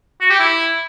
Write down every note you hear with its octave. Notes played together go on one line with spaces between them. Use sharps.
F#4
G4
E4